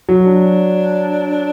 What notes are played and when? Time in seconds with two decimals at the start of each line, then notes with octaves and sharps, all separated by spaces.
0.09 F#3
0.26 D4